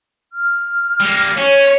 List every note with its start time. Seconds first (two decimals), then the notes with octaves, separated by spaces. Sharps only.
0.32 F6
1.00 G3 A#3
1.38 C#4 C#5